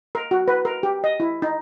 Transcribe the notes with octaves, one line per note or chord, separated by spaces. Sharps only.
A#4
F#4
B4
A#4
G4
D#5
E4
D#4